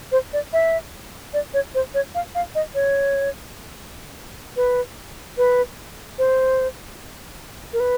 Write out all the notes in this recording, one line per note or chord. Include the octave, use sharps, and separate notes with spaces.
C5
D5
E5
D5
C#5
C5
C#5
F5
F5
D#5
C#5
B4
B4
C5
A#4
B4